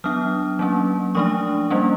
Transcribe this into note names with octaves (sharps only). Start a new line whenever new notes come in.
F#3 B3 D4 D#6 F6
F#3 A#3 C#4
F3 A3 D4 C#6 D#6
G3 A#3 C#4